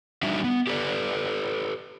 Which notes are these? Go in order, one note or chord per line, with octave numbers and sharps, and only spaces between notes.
G3 A3 D4 D#4 F#4 E5
B3
G4 A4 B4 D5